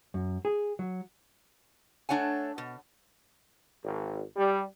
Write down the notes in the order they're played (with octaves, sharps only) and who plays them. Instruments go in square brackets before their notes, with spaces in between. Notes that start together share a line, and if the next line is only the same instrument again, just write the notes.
[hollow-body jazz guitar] F#2
G#4
F#3
[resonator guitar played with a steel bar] A3 D4 C#5 F#5 G#5
B2
[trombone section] G#1
G3